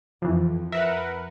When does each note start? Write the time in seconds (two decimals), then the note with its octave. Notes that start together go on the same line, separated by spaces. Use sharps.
0.22 F2 E3 F3
0.72 A#4 B4 E5 F#5